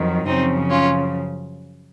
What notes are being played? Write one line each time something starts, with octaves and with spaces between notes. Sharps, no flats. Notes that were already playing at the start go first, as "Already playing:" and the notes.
Already playing: F2 D#3 F#3
F#2 C#3 F3 C4 D#4
C#4 F4